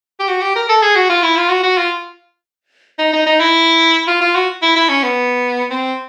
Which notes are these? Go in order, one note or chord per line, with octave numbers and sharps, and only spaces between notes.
G4
F#4
G4
A#4
A4
G#4
F#4
F4
E4
F4
F#4
F#4
F4
D#4
D#4
D#4
E4
F4
F4
F#4
E4
E4
C#4
B3
C4